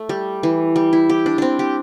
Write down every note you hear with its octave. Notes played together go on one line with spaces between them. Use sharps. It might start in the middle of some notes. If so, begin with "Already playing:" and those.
Already playing: A3
G3
E3
G3
E4
G4
D4
C4 D4
G4